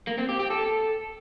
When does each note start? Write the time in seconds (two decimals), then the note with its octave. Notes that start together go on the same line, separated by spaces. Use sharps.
0.07 A#3
0.18 C4
0.29 G4
0.40 G4
0.50 A4